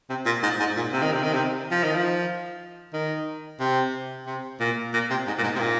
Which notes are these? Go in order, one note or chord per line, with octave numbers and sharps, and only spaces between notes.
C3
A#2
G#2
G#2
A#2
C3
D#3
C3
D#3
C3
F3
D#3
F3
D#3
C3
C3
A#2
A#2
C3
G#2
A#2
G#2
C3
A#2